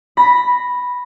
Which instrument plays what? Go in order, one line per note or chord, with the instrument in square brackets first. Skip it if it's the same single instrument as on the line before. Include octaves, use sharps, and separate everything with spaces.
[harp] B5 A#6